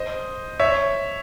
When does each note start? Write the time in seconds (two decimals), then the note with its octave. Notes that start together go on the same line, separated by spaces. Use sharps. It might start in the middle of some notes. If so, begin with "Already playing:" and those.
Already playing: C5 D#5
0.60 C#5 E5